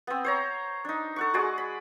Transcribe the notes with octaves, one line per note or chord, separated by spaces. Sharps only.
B3 C4
C5 C#5 A#5
D4 D#4
A4 F#5 C#6
G#3 F#4 G#4 D5
B5